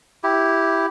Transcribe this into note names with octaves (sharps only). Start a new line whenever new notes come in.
E4 G4